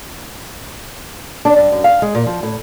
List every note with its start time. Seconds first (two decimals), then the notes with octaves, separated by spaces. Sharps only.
1.45 D4
1.57 G2
1.72 F#2
1.84 F5
2.02 G#3
2.15 A#2
2.26 F3
2.43 A2